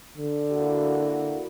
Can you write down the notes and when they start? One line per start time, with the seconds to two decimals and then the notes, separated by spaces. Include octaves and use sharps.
0.17 D3
0.51 A#3 E4 F#4